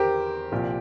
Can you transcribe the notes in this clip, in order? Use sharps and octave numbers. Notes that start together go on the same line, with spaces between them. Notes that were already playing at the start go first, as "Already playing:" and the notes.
Already playing: E2 G4 A#4 C5
C2 A#2 F3